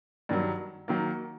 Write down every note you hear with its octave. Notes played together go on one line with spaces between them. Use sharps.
G2 D#3 F#3
D#3 F#3 A#3